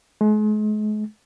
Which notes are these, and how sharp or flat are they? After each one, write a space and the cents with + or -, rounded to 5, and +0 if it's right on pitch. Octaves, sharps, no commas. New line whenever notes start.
G#3 +40